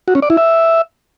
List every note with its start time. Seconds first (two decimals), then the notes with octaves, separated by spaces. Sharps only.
0.08 F#4
0.15 C#4
0.22 D5
0.30 E4
0.37 E5